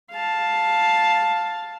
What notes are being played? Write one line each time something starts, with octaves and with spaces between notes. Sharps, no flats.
F5 A5